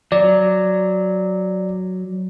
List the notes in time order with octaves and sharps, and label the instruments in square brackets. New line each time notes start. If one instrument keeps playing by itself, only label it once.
[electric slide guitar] F#3 [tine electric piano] D5